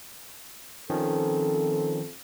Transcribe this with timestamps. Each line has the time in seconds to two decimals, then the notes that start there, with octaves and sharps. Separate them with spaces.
0.90 D#3 F3 C4 C#4 F4 A4